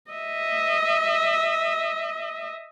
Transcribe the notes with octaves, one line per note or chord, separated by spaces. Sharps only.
D#5 E5